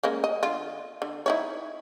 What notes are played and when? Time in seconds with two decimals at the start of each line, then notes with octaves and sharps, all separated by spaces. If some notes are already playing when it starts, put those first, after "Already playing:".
0.03 G#3 A#3 C#4
0.24 D#5
0.43 D3 F4
1.02 D3
1.26 D#4 E4 C#5